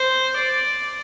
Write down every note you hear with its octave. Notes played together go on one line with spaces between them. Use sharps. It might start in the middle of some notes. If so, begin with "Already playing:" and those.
Already playing: C5
D5